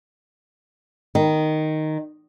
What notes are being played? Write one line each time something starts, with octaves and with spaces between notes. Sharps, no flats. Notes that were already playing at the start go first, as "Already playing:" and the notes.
D#3